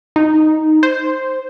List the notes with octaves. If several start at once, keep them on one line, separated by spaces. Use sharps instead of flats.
D#4
C5